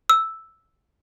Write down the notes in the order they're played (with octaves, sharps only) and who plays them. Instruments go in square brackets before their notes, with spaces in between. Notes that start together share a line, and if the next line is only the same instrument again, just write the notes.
[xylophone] E6